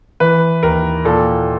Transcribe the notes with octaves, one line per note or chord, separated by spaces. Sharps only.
E3 B4
D#2 A#4
A#2 A4